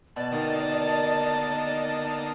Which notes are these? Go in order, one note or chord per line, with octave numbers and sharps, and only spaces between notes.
B2 D5 A5
D3 D#3 A#3 D#4